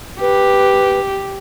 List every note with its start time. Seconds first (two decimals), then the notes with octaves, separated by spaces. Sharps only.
0.20 G4 B4